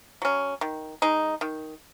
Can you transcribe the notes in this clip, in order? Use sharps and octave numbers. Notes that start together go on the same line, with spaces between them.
F#3 C#4
D#3
G#3 D#4
D#3